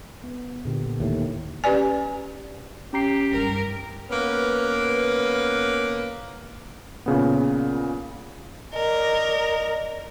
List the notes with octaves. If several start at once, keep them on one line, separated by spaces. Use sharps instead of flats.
B3
A#2 D3 G4
D#2 A2
C#4 G4 B4 D5 G#5
C#4 G4 A#5 C7
G2 D#3 A#4
A#3 B3 C#4 B4
A#2 C#3 B3
A#4 D5 D#5